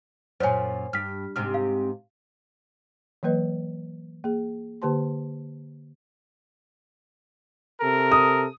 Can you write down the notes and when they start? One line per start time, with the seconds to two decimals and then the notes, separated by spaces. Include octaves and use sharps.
0.40 F#2 A#2 C5 C#5 G#5
0.93 G2 F6 B6
1.36 G#2 C3 F6
1.54 F5
3.23 E3 F#3 A#3 B4 D#5
4.24 A#3 G#4
4.82 D3 A#3 G4 C5 A5 C6
7.81 C3 A4 A#4
8.12 D#6